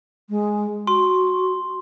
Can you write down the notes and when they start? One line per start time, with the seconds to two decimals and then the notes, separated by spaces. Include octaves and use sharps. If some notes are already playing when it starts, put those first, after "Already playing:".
0.29 G#3
0.87 F#4 C6